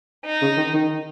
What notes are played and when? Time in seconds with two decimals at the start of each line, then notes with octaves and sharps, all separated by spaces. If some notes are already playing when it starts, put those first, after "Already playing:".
0.25 D#4
0.42 C#3
0.57 D#3
0.73 D#3